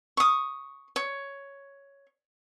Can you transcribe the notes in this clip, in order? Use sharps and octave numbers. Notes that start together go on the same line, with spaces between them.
C#6 D#6
C#5